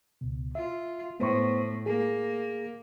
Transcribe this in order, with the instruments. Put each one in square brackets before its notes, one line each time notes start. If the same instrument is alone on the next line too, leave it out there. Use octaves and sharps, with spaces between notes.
[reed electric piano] C#2 B2
[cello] F4 [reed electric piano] E5
[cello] A2 [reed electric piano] B3 C5 C#6
[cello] A#3 [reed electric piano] G#4